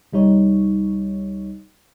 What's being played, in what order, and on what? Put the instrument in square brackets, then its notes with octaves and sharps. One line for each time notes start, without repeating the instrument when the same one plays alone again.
[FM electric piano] C2 G3 D#4 C#5